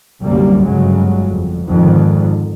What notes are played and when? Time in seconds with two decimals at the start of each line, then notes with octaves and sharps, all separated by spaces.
0.22 C2 F#2 D3 G3 A#3
0.64 G1 C#3 F#3 G#3
1.31 F2
1.68 F2 G#2 D3 D#3